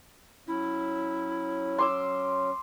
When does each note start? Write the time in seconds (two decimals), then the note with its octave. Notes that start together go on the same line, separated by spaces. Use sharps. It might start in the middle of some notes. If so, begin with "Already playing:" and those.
0.47 F#3 C#4 E4
1.79 C6 D6 E6